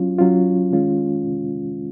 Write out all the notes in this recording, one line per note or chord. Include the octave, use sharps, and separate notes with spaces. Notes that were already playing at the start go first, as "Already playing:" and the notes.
Already playing: F#3 C#4 F4
F#3 C#4 F4
D#3 G#3 C#4 F4